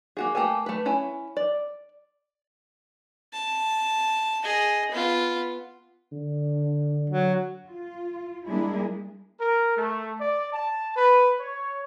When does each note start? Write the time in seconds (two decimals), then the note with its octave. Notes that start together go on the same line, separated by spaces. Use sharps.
0.17 A#3 F#4 G#4
0.35 A3 A#3 G4 A4 G#5
0.66 A3 B4
0.85 C#4 E4 G#5
1.37 D5
3.33 A5
4.44 G#4 D#5
4.92 B3 F4
6.12 D3
7.10 F#3
7.67 F4
8.47 G3 G#3 A#3 D4 E4 G#4
9.40 A#4
9.76 A3
10.20 D5
10.53 A5
10.95 B4
11.40 C#5